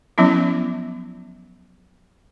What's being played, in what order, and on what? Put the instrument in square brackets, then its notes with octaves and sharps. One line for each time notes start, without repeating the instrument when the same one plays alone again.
[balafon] F3 F#3 B3 C#4 E4